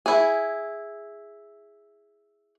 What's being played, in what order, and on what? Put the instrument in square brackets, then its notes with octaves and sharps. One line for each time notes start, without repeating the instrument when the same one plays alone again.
[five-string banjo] E4 G#4